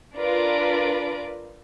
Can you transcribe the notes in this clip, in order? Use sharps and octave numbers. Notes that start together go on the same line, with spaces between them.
D4 F4 A#4 B4 D5 D7